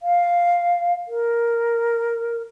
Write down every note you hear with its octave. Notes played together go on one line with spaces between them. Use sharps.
F5
A#4